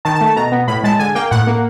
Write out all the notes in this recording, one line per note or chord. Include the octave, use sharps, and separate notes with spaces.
D#3 A5
A5
A3
A5
B2 A#5
B3
A2 B5
G#3 A5
D3 G#5
A#3 G5
A2 F#5
A#3